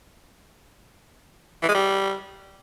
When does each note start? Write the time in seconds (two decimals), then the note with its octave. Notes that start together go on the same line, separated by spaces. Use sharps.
1.62 E3
1.68 G#3
1.75 G3